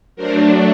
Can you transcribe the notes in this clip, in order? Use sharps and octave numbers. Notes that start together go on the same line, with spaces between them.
F#3 A3 D4 A#4 C5